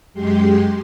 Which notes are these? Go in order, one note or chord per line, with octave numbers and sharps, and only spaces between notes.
F#2 G#3 G4 C6